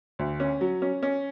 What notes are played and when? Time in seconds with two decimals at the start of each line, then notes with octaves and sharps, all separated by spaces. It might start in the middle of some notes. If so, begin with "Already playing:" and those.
0.19 D2
0.40 C#4
0.61 F#3
0.82 C#4
1.03 C#4